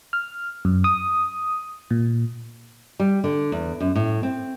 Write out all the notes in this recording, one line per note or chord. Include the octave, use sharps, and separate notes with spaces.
F6
F#2
D#6
A#2
G3
D3
E2
F#2
A2
C4